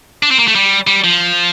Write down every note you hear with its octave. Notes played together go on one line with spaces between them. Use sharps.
D4
C4
A#3
A3
G3
G3
F3